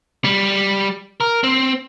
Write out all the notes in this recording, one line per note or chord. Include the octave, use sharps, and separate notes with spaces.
G3
A#4
C4